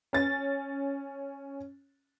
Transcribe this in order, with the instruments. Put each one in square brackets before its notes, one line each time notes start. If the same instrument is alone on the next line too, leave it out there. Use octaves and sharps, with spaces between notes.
[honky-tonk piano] C#4 A6